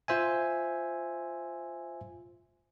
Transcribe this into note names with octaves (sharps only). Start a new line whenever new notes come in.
F4 C5 E5 G#5